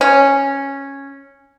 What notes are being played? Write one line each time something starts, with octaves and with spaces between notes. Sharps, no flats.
C#4